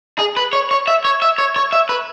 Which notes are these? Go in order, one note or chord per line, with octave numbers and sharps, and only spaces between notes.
G#4
B4
C#5
C#5
E5
C#5
E5
C#5
C#5
E5
B4